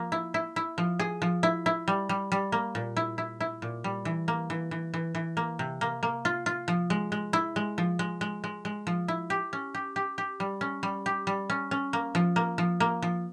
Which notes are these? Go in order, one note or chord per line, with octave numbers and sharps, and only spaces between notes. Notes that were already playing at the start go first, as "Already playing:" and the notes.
Already playing: F3 A#3
E4
E4
E4
F3
G#4
F3
E4
E4
G3
G3
G3
A#3
A#2
E4
E4
E4
A#2
G3
E3
A#3
E3
E3
E3
E3
A#3
C3
A#3
A#3
F4
F4
F3
G#3
G#3
E4
G#3
F3
G#3
G#3
G#3
G#3
F3
E4
G4
C#4
G4
G4
G4
G3
C#4
G3
G4
G3
C#4
C#4
A#3
F3
A#3
F3
A#3
F3